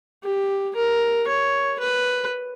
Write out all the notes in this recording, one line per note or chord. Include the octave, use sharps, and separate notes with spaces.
G4
A#4
C#5
B4